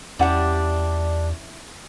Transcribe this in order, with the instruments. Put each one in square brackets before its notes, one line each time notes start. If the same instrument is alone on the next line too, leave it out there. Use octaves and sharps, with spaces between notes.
[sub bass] E2 [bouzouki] G3 D4 [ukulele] C#4 E4 F#5